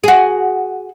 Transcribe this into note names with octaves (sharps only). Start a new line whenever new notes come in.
F#4 G#4